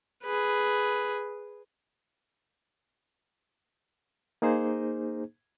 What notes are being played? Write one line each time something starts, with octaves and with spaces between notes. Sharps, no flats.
G#4 B4
A#3 D#4 G#4 C5